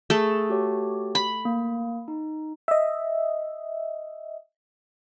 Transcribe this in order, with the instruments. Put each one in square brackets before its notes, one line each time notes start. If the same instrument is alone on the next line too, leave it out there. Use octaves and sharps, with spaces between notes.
[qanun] A3 A4 [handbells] G#4
[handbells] F#4 G4 C#5
[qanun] B5
[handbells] A#3
D#4
[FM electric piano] D#5 E5